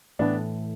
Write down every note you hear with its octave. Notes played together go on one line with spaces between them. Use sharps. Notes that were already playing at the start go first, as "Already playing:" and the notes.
A2 E3 A3 B3 D4